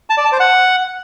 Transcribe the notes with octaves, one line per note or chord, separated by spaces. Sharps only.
A5
D5
A5
C5
F#5